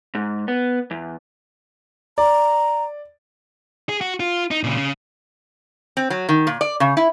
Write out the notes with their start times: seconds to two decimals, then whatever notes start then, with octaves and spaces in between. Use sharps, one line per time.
0.15 G#2
0.48 B3
0.91 E2
2.18 D5 A#5
3.89 G#4
4.01 F#4
4.20 F4
4.51 D#4
4.63 A#2 C#3
4.77 C#3
5.97 C4
6.10 F#3
6.29 D#3
6.47 A#2
6.61 D5
6.80 C#3
6.97 E4